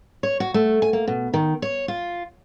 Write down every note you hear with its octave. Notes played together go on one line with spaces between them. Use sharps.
C#5
F#4
A3
G#5
A#3
B2
D#3
C#5
F4